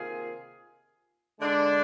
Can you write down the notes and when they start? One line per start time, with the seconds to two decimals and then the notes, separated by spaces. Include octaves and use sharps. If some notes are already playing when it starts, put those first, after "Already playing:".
Already playing: C3 D#3 A#3 F4 G#4
1.40 D3 G#3 D4